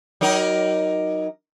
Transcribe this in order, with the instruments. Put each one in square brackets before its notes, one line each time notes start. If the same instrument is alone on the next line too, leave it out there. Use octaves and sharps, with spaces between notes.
[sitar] F#3 D#4 A#4